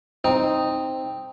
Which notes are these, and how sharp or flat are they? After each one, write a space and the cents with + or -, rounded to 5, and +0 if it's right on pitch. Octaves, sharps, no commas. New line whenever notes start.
C4 +0 D#4 +0